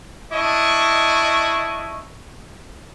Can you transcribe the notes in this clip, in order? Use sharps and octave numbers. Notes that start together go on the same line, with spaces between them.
D4 E4 D#5 C#6